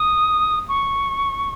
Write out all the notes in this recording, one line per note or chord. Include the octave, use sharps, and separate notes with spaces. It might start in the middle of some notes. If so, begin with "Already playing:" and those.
Already playing: D#6
C#6